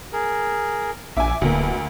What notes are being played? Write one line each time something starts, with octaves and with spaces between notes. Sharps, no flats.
G#4 A#4
A#1 E5 G#5 D6
D1 D2 B2 A#3